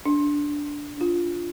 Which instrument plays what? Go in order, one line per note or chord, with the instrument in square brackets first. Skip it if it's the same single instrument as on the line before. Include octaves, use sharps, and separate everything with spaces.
[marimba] D4
D4 F4